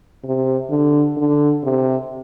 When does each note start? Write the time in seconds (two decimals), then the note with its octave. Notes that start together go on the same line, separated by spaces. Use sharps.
0.24 C3
0.70 D3
1.17 D3
1.64 C3